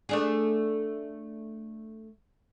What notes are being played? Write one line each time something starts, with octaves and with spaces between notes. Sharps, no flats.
A3 D4 G#4